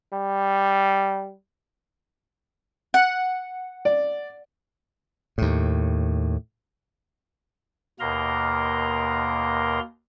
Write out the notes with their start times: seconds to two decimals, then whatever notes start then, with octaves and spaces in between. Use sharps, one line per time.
0.13 G3
2.94 F#5
3.85 D5
5.38 D#2 A2
8.00 D#2 B2 A#3 A#4 A#5 C6